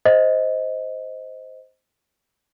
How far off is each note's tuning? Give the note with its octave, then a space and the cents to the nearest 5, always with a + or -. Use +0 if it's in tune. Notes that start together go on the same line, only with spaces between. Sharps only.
C5 -5 D#5 +10